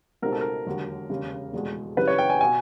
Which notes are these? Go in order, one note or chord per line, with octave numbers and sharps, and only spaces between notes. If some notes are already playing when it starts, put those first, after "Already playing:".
C#2 B2 G3 C4 D#4 A#4
A4
A#4
E1 D#2 D3 F#3
E1 D#2 C#3
F1 E2 B2 G#3
F#2 C#3 E3 G3 B4
C#5
G5
G#5
B2 G#5